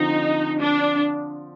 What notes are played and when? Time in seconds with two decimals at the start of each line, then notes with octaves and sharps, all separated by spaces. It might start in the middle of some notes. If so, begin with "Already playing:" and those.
Already playing: D3 F3 C4 D#4
0.60 D4